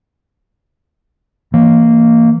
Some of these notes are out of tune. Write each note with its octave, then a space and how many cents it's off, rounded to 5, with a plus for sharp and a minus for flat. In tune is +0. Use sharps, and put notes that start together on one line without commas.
E3 +20 A#3 -15